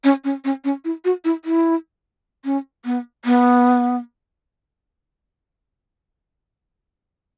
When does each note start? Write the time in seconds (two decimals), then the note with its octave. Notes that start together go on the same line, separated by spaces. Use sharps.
0.04 C#4
0.24 C#4
0.44 C#4
0.64 C#4
0.85 E4
1.05 F#4
1.25 E4
1.45 E4
2.45 C#4
2.85 B3
3.25 B3